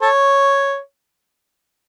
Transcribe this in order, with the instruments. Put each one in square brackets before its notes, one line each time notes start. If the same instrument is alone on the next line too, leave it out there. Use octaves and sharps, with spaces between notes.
[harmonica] A4 C#5